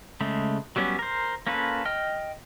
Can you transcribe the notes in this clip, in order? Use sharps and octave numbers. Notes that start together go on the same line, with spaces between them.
C#3 G#3 A3
F#3 G3 B3 C#4
A#4 C5
A#3 C#4 F4 A4 B4
D#5 G5 F6